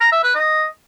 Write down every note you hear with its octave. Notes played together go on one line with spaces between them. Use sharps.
A#5
E5
B4
D#5